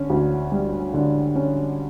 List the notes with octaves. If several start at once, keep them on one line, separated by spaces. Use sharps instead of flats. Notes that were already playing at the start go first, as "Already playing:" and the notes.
Already playing: D3 C#4
D2
G3
D3
C#4